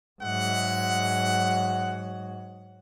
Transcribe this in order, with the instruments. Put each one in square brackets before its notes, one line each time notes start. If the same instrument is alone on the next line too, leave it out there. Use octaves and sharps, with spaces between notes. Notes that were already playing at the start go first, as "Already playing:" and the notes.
[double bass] G#2 F#3 [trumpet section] G#3 E5 F#5